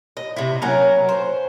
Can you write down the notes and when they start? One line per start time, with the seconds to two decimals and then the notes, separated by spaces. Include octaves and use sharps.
0.17 D#5
0.36 C3 E4
0.62 F#3 C#4 A#4
1.09 C5